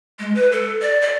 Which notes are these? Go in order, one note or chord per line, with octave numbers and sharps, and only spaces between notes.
G#3
B4
A4
D5
D5